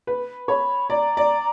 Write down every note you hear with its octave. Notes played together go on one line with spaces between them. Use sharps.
B4
C#5 B5
D5 A#5
D5